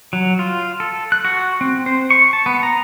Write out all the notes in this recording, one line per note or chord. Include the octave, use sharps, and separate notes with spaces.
F#3
F4
A4
F#6
F#4
C4
C5
C#6
A5
B3
A#5